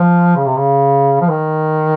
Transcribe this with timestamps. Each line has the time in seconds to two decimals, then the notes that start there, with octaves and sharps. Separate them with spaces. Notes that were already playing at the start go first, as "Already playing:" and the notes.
Already playing: F3
0.36 C#3
0.46 C3
0.57 C#3
1.21 F3
1.29 D#3